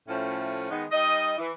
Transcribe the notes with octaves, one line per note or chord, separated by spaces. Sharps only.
A2 F3 A3 C#4
D#3 G#3 B3 D#4
G3 D#4 D#5
E3